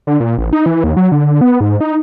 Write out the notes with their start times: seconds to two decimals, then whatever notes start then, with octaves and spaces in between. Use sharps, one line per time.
0.07 D3
0.20 A#2
0.38 A1
0.53 D#4
0.66 E3
0.84 D#2
0.97 F#3
1.12 D3
1.41 B3
1.61 G#2
1.80 D#4